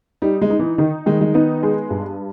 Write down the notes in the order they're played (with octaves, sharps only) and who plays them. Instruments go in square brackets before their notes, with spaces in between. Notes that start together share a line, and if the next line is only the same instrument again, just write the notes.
[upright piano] G3 [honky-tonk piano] D#4
[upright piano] G#3
[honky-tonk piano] D#4
[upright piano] E3
[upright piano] D#3 [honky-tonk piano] D#4
[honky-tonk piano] D#3 [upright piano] G#3
[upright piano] G#3
[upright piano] B3 [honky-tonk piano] D#4
[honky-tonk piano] G#3
G2